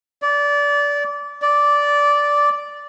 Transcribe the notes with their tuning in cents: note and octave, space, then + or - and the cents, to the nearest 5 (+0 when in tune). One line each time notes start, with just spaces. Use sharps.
D5 -25
D5 -10